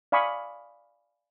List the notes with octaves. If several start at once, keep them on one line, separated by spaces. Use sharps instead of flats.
D5 F5 G#5 B5 C#6 D#6